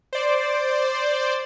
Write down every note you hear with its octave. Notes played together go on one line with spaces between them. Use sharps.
C5 D5